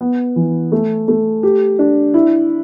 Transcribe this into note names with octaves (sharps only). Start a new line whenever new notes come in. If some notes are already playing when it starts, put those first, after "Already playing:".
B3
E3
A3
A3
G4
D4
E4